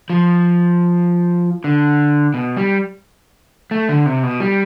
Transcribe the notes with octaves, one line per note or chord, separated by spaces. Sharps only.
F3
D3
B2
G3
A3
D3
C3
B2
G3